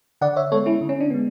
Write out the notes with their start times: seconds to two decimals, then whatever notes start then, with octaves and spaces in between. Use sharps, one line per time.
0.21 D3 D5 F#5
0.36 C#5 E5
0.51 G#3 B3 A4 C#5
0.66 C#4 E4
0.81 D3
0.89 C#4
1.00 D4
1.10 G#3 B3